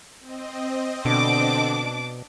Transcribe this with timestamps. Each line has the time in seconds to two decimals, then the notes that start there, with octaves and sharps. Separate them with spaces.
0.21 C4 D#5
1.05 B2 D3 D4 D6